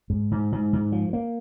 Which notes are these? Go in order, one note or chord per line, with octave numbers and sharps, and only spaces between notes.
G#2
G#2
G#2
G#2
F3
A#3